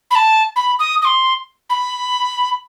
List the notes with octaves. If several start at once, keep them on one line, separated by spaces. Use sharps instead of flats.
B5
A5
B5
D#6
D#6
C6
B5